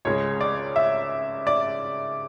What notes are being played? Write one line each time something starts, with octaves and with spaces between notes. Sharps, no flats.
C#2 C#3 G#3 C#5
D5
E5
D5